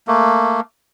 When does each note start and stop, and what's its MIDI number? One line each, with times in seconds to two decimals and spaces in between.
0.08 0.60 57
0.08 0.60 58